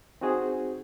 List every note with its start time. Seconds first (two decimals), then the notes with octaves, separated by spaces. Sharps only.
0.21 C4 D#4 F#4 G#4 C5